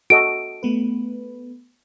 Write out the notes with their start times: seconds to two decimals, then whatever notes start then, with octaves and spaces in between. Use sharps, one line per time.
0.10 F#4 A4 D#5 D7
0.63 A3 B3 B4